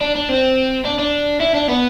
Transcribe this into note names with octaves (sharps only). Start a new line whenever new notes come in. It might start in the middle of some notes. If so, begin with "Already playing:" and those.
D4
D4
C4
D4
D4
E4
D4
B3